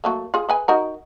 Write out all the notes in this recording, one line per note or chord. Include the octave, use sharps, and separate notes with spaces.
F#3 A3 A#3
F4 G#4
G#4 B4 G#5
D#4 F#4 A#4